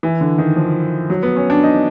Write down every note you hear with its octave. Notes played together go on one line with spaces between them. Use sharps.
E3
D3
D#3
F3
F#3
B3
C#4
D4
D#4